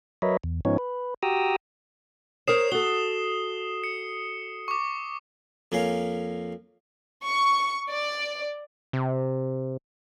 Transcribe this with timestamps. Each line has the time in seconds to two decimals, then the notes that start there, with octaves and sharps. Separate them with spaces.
0.22 F#3 A#4 B4 C#5 D#5 E5
0.44 E2
0.65 G#2 F3 B3 C#4 D#4 C#5
0.78 B4
1.23 F#4 G4 G5 A#5 D#6 E6
2.47 A#4 C5 C#5 D#6 C7 E7
2.72 F#4 A4 G7
3.84 C#7
4.68 C#6 D6
5.72 F2 A#3 C#4 F5
7.25 C#6
7.90 D5
8.93 C3